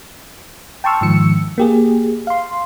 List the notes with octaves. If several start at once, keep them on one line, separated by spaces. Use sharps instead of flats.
G5 A5 C6 C#6 E6 F6
G#2 D#3 F3 E6 C#7
A#3 G4 G#4
F5 C6